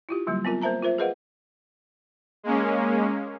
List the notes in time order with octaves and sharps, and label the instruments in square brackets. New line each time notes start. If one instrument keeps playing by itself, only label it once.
[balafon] E4 F4 G4
D3 F#3 G3 A#3
B3 C4 F4 A#4
A#3 A#4 C5 E5 A5 A#5
F4 A#4 C5 E5
G#4 A#4 B4 D#5 F5 F#5
[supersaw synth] G#3 A#3 C#4